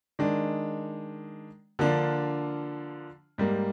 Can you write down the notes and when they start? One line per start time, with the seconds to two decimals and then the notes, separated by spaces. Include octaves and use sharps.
0.19 D#3 G#3 D4
1.79 D3 F3 A#3 D4 F4
3.38 G#2 G3 A#3